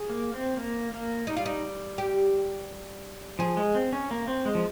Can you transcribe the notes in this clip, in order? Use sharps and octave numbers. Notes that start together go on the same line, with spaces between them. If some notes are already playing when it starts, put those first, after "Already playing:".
Already playing: G#4
A#3
C4
A#3
A#3
G3 D#4
F4
D#4
G4
F3 G#4
G#3
C4
C#4
A#3
C4
G#3
F3